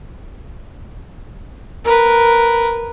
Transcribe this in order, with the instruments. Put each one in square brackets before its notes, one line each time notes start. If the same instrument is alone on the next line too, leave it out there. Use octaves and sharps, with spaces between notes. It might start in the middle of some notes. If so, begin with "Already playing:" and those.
[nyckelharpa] A#4 B4